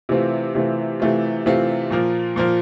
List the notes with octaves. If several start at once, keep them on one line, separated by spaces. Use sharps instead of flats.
C3 E3 A3 C4 F4
C3 E3 A3 C4 F4
C3 E3 A3 C4 F4
C3 E3 A3 C4 F4
A#2 F3 A#3
A#2 F3 A#3